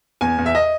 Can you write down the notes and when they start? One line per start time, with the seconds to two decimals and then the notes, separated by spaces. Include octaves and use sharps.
0.21 E2 G#5
0.38 E2
0.46 E5
0.55 D#5